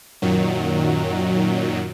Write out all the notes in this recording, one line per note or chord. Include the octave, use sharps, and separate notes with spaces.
F#2 A#2 D#3 F#3